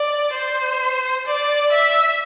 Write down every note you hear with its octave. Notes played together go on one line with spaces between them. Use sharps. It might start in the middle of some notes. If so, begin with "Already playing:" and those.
Already playing: D5
C5
D5
E5